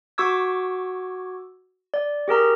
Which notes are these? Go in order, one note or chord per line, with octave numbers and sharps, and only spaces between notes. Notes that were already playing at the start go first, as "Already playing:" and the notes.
F#4 C#6 D6 E6 G#6
D5
G4 G#4 A#4 A#5